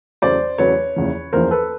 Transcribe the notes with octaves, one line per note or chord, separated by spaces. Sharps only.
E2 C#3 F#3 A3 C5 D5
E2 C#3 F#3 A3 B4 C#5
F#1 E2 C#3 F3
F#1 E2 C#3 F3 A#4 C5
A4 B4